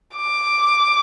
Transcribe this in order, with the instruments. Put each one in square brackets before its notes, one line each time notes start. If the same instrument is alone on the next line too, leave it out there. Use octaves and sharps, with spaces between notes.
[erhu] D6